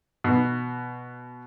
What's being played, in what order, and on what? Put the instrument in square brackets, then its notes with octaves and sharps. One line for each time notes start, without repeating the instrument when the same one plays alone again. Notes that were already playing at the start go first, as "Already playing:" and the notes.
[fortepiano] B2